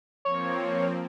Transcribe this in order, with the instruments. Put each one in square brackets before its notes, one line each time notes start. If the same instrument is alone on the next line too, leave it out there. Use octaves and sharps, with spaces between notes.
[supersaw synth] F3 A#3 C4 [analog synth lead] C#5